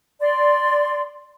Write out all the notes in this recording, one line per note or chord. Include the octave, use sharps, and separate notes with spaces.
D5 C6